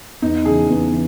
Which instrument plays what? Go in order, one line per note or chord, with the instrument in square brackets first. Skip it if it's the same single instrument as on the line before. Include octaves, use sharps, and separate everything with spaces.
[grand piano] E2 [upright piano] D#4
[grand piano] C#3 E3 [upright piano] G#4
[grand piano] E2
E3